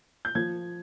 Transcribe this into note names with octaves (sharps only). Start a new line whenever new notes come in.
G6
F3 G#6